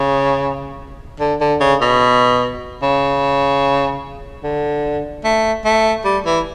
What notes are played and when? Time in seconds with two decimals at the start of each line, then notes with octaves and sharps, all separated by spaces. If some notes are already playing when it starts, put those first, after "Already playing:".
Already playing: C#3
1.20 D3
1.41 D3
1.60 C#3
1.81 B2
2.82 C#3
4.43 D3
5.24 A3
5.65 A3
6.05 G3
6.25 E3